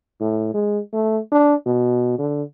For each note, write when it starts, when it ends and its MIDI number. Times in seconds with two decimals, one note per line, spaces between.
0.20 0.50 45
0.54 0.79 56
0.93 1.18 57
1.32 1.55 62
1.66 2.17 47
2.18 2.43 50